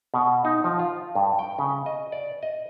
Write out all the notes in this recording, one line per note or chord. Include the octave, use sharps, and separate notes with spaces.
B2
D#4
F3
F4
G2
G5
C#3
D#5
D5
D#5